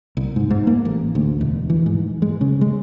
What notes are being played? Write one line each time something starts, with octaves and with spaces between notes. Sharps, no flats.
C2
G#2
G#2
A#3
A1
D2
E1
E3
G#2
G#3
C#3
G#3